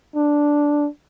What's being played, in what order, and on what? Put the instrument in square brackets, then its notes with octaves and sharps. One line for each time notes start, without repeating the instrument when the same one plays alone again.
[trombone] D4